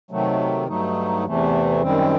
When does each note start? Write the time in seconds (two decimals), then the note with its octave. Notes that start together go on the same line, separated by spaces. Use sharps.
0.11 C3 D#3 F#3 A3
0.68 G2 F#3 A3 D#4
1.24 E2 C3 E3 A3
1.81 F#2 D#3 G3 C4